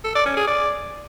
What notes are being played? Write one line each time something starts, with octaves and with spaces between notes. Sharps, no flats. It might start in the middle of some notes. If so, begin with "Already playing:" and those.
A4
D5
C#4
G#4
D5